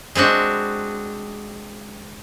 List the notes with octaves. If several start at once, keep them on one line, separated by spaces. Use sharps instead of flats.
G#3 C4 D4 F#4